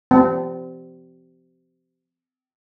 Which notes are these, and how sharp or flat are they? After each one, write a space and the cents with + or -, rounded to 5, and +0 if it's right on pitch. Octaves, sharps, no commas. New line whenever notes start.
C4 -30